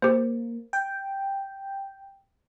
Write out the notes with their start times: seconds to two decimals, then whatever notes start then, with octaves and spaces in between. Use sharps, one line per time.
0.02 A#3 G4 C5
0.73 G5